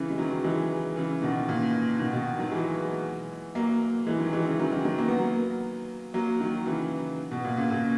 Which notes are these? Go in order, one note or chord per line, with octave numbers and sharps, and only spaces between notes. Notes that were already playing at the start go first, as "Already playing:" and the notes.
Already playing: C#3 E3
G#3
D#3 F#3
E3 G#3
C#3 E3
B2 D#3
A#2 C#3
B2 D#3
B2 D#3
D#3 F#3
E3 G#3
F#3 A#3
E3 G#3
D#3 F#3
E3 G#3
C#3 E3
D#3 F#3
D#3 F#3
D#3 F#3
A#3
B3
F#3 A#3
F#3 A#3
D#3 F#3
C#3 E3
B2
A#2
A#2 C#3
A#2 C#3